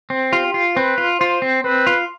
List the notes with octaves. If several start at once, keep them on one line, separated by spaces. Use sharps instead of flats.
C4
F4 G4
F4
C4 B4
F4
F4 C5
C4
C4 B4
F4